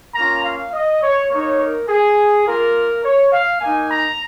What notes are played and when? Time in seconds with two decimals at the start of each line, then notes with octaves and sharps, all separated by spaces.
0.15 A#3 C#4 F4 A#5
0.44 F5
0.73 D#5
1.02 C#5
1.31 A#3 D#4 C#5
1.59 A#4
1.88 G#4
2.45 A#3 F4 A#4
3.04 C#5
3.32 F5
3.61 A#3 D#4 G#5
3.90 A#5